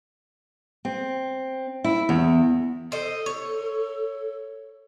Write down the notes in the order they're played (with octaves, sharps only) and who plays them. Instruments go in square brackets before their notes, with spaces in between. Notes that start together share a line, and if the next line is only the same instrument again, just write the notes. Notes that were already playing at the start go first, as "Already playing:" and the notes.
[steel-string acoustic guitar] C4
E4
E2
[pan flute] A4 [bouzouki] C5 D#5
[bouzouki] C#5